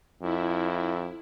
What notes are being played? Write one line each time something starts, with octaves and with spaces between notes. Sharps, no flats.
F2 E4